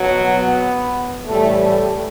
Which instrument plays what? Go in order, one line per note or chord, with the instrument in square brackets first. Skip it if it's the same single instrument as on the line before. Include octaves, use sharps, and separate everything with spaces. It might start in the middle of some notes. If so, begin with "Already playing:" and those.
Already playing: [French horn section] B2 F#3
B3
A2 E3 G3 A3
A3